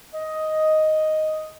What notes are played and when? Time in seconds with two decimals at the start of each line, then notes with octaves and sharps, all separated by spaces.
0.14 D#5